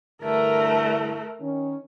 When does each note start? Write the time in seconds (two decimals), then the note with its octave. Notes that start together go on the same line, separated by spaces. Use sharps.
0.22 G2 D3 E3 A3 A#4
1.41 D#3 C#4